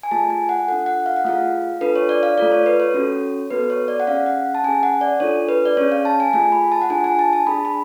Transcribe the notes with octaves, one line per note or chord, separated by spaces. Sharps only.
G#5
A3 F4 G#4 A5
G#5
F#5
D4 F4 A4 F#5
F#5
F5
F#5
A3 F4 G#4 F5
D4 F4 A4 B4
C#5
D5
F5
A3 F4 A4 D5
C#5
B4
C#5
C#4 F#4 A4
B3 F#4 A4 B4
C#5
D5
F#5
C#4 G#4 F5
F#5
A5
C#4 G#4 G#5
F#5
D5
D4 F4 A4 C#5
B4
D5
C#4 G#4 C#5
F5
A5
G#5
A3 F4 G#4 G#5
B5
A5
F#5
D4 F4 G#4 G#5
G#5
A5
A5
D4 G#4 B5
B5